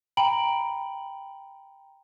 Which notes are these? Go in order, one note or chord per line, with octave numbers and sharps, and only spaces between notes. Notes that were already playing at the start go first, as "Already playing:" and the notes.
G5 A#5 B5 D7 F#7